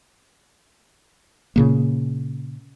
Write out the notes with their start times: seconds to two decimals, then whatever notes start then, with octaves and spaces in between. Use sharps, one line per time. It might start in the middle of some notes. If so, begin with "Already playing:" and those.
1.56 A#2 C#3 A#3